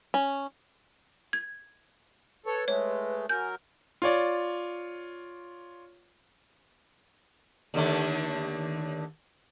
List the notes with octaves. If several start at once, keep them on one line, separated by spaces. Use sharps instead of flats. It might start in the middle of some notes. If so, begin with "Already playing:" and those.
C#4
G#6
A4 B4 C#5
G#3 A3 C#5
F#3 A#4 G#5 G6
F4 C#5 D5
D#2 D3 A3